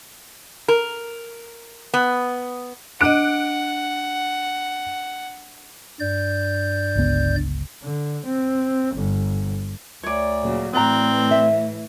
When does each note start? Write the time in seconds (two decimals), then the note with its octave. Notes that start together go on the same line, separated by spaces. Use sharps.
0.68 A#4
1.94 B3
3.01 D4 D#5 F#5 F#6 D7
6.00 G2 D5 G6
6.96 G1 C#2 B3
7.83 D3
8.25 C4
8.95 G1
10.03 D2 C#5 D5
10.43 A#2 C#3 F#3
10.73 A2 E3 C4 B4 D5 A#5
11.31 E5